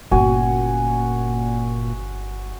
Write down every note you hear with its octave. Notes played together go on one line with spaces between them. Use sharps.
G1 A#2 C#4 F#4 G#5